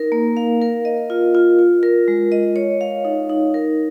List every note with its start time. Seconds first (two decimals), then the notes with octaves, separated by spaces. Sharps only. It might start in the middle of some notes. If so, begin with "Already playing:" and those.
Already playing: D#4 A#4
0.12 A#3
0.37 F5
0.62 A#4
0.85 D#5
1.10 F4
1.35 F4
1.59 F4
1.83 A#4
2.08 G#3
2.32 D#5
2.56 C#5
2.81 F5
3.05 D#4
3.29 D#4
3.54 A#4